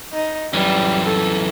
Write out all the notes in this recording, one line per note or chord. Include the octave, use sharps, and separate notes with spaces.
D#4
F#2 E3 G3
A4